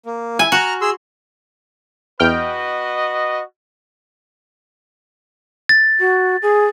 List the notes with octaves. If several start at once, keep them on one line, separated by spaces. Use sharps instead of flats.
A#3
E4 G#5
F#4 A#5 F6 F#6
G#4 C6 E6
E2 F#4 B4 D#5 G5 F6
A6
F#4
G#4